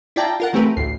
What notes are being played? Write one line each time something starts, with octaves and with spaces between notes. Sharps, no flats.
E4 F4 D5 G5 A5 A#5
F4 A#4 F#5
E3 A3 C4 G4 A#4 B4
A1 D2 C7